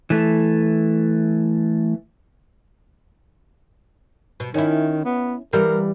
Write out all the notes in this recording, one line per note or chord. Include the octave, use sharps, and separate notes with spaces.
E3 A3
B2
D#3 C#4 E4
B3
E3 G3 A#4 F5